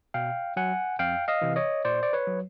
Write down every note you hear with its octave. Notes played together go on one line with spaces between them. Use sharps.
B2 F5 G5
F#3 F#5 G#5
F2 F5 G5
D#5 F5
C3 E3
C#5 D#5
A#2 C5 D5
D5
B4 C#5
F#3